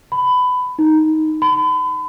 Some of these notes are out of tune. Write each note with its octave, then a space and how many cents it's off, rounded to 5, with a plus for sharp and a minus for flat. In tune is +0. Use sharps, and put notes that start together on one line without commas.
B5 +20
D#4 +10
B5 +40